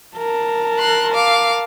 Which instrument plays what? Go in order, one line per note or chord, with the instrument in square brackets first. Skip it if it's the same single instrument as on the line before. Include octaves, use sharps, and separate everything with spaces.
[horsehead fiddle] A#4 A5
[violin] C6 F#6
F5 D6